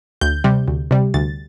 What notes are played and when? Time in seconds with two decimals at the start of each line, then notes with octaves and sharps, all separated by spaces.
0.21 D2 G6
0.44 C3 G3
0.68 D2
0.91 C3 G3
1.14 D2 A6